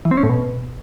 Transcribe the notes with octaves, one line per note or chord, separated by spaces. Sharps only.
E3
C4
C#4
A2
B2